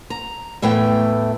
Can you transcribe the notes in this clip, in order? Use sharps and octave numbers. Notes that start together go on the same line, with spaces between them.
A#5
E2 A2 E3 A3 G5